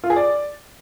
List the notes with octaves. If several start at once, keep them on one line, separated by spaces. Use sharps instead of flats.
F4
G#4
D5